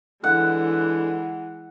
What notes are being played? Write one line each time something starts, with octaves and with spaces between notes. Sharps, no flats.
D3 E3 G#3 F#5